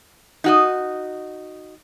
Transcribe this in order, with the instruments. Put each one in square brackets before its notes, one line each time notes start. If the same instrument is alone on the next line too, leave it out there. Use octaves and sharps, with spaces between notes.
[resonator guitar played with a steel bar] D#4 F#4 D#5